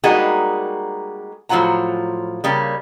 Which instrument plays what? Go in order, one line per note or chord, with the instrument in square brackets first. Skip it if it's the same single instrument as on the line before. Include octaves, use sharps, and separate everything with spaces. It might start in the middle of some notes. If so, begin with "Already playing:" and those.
[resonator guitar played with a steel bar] G3 G#3 A#3 D#4 F#4 G#4
A2 F3 F#3 F4 F#5 A#5
C#3 G3 A#3